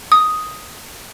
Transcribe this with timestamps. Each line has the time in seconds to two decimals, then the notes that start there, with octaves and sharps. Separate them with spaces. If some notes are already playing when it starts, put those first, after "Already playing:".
0.12 D#6